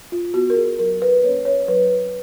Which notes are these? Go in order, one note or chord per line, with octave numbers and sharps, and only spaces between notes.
F4
B3 F#4
A#4
G#4
F#3 A#4
B4
A#3 C#4 C#5
C#5
F#3 B4